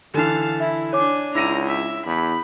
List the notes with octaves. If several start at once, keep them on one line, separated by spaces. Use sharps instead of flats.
D3 E3 F5 A5
E4 E5
D4 C#5 G#5 D6
C#2 E4 A#5 A#6 D#7
E5
E2 B5